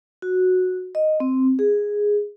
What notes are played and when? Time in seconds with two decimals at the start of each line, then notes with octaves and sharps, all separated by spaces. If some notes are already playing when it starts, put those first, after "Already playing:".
0.22 F#4
0.95 D#5
1.20 C4
1.59 G#4